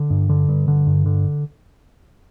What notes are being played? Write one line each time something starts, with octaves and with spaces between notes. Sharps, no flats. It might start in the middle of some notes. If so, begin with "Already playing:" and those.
Already playing: D3
G2
D3
G2
D3
G2
D3